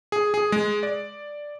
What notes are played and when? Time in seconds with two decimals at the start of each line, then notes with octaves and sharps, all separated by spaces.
0.12 G#4
0.34 G#4
0.52 G#3
0.83 D5